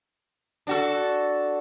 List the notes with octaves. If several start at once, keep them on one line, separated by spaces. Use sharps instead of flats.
D4 F#4 A4